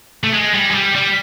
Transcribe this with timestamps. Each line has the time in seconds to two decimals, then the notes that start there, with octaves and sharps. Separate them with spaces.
0.24 A3
0.33 G#3
0.54 G3
0.71 G#3
0.74 G3
0.95 G3